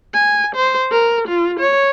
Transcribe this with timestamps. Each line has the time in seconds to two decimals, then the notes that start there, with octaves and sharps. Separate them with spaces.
0.14 G#5
0.55 C5
0.92 A#4
1.28 F4
1.60 C#5